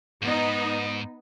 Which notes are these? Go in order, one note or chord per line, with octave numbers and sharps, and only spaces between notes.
G#2 B3 D#4 D#5